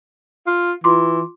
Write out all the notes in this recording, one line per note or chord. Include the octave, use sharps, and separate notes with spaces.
F4
E3 F4 C6 D6